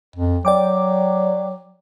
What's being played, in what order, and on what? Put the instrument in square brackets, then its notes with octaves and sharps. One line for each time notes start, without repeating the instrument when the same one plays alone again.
[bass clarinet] F2
[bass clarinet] F#3 [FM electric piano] D5 G5 D6